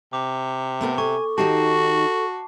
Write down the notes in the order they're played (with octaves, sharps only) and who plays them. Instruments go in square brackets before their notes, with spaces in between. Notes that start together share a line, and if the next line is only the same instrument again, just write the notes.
[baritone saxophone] C3 [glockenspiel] D6
[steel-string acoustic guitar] A3 B3 A#4
[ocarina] A4 [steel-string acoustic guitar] G#5 [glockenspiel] C#6
[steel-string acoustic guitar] D#3 D#4 G4 [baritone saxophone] F#4 [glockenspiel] A5 C7